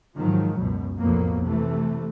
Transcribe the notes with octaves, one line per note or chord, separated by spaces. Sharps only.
G#2 D#3 F3 F#3
C#2 F#2 B2
B1 F2 A2 F#3 A#3 B3
C3 E3 A3